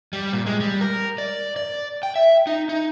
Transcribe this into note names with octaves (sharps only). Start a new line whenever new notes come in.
G3
A#2
G#3
G3
A#4
D5
D5
G5
E5
D#4
D#4